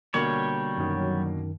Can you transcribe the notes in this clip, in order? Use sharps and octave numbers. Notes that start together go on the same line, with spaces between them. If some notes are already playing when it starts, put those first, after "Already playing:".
B2 D3 G3 A#3 C#5
F#2 D#3 F#3